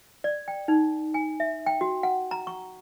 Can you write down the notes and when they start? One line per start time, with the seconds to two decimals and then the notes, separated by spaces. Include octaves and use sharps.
0.24 D5
0.48 G5
0.68 D#4
1.14 G#5
1.40 E5
1.66 G5
1.81 F#4
2.03 F#5
2.31 A#5
2.47 C#6